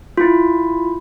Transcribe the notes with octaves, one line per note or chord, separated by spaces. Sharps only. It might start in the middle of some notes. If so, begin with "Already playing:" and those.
E4 F4